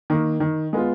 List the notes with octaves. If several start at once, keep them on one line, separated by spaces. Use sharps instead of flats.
D#3 A#3
D#3
G#3 B3 F4